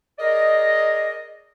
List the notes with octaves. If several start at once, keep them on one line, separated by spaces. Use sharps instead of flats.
G#4 A#4 D5 D#5